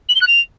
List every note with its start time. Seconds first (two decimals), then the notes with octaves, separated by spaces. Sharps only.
0.09 F#7
0.15 G7
0.21 F#6
0.27 F7